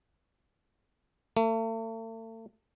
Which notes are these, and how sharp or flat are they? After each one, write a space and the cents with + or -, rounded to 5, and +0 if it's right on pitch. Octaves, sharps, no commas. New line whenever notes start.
A3 +40